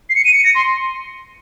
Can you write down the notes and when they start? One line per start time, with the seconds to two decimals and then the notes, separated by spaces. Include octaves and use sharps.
0.10 C7
0.15 C#7
0.25 D#7
0.34 C#7
0.44 A#6
0.55 C6